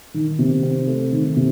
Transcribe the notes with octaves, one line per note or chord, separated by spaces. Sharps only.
D#3
C3
C4
A3
D#3
C3